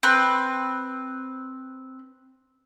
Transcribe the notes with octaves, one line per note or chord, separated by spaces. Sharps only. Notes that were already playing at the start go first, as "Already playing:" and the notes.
C4 B4